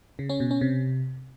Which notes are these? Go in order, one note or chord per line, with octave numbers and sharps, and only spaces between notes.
C#3
C#4
B2
C#4
C3